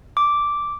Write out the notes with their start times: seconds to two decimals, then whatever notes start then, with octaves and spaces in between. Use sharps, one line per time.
0.17 D6